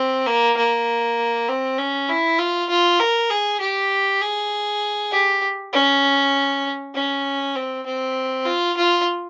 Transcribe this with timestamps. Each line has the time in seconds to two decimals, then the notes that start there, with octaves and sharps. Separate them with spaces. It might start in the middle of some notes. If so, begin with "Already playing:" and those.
Already playing: C4
0.26 A#3
0.57 A#3
1.49 C4
1.78 C#4
2.09 E4
2.38 F4
2.70 F4
3.00 A#4
3.30 G#4
3.60 G4
4.21 G#4
5.12 G4
5.73 C#4
6.94 C#4
7.56 C4
7.86 C4
8.45 F4
8.77 F4